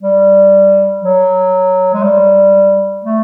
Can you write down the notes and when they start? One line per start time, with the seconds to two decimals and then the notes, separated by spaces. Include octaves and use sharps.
0.03 G3
1.03 F#3
1.94 G#3
2.03 G3
3.04 A3